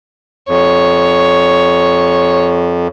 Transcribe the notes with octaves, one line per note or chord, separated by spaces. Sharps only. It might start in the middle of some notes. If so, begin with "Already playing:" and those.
F2 C#5